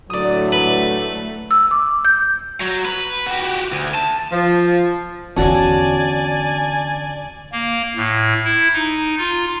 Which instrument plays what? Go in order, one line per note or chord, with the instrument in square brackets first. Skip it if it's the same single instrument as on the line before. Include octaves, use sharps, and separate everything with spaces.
[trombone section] A2 D3 F#3 [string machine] A3 [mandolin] D5 D#6
[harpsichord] B4
[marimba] E6
D6
G6
[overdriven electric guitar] F#3
B4
F#4 G4
D2
A5
[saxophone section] F3
[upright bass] E2 D3 [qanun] C#4 F#4 [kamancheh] D5 G#5 [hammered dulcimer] A5
[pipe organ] A#3
A2
E4
D#4
F4